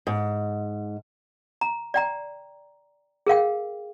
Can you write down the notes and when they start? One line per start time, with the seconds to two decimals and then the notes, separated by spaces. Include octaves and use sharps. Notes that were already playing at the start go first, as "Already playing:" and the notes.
0.07 G#2
1.61 A#5
1.94 D5 G5 A#5
3.27 G#4 A#4 F5 G5